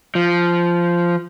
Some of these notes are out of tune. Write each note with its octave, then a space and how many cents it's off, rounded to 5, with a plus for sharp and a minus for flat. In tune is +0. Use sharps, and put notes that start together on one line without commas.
F3 -10